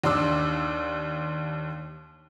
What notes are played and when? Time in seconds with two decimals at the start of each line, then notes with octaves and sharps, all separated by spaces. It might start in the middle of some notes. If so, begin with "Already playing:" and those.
0.04 D#2 D4 C6 D6 E6